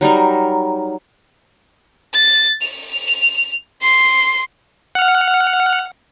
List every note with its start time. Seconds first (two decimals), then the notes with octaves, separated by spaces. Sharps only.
0.01 F#3 G3 D#4 A#4
2.14 A6
2.62 F7
3.82 C6 C7
4.95 F#5 F6